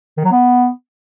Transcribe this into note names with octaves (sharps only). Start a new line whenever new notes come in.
D#3
F#3
B3